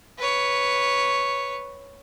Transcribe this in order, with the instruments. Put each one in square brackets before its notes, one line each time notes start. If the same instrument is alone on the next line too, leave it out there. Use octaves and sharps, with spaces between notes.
[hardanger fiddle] B4 C#5